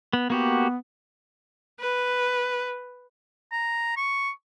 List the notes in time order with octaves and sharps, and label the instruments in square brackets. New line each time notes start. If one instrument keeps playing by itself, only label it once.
[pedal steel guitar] B3
[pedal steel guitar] A#3 F#4 G4 [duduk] B3
[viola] B4
[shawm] A#5
C#6